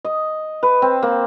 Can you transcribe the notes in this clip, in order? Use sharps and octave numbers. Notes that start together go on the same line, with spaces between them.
D#5
B4
C4
A#3